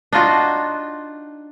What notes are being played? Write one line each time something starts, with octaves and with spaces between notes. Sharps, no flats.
D4 D#4 F4 F#4